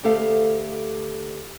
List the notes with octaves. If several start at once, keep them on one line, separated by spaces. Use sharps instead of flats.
D2 A3 G4 A4 E5 F5